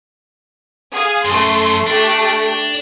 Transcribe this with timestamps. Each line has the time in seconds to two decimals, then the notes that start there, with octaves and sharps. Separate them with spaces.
0.92 G#4 F5
1.25 F#2 A3 C6
1.87 A3 D4 G4